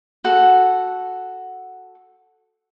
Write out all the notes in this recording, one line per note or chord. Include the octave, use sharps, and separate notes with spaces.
F#4 A4 F#5